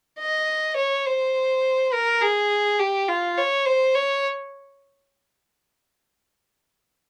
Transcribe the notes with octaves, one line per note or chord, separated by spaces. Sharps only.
D#5
C#5
C5
A#4
G#4
G4
F4
C#5
C5
C#5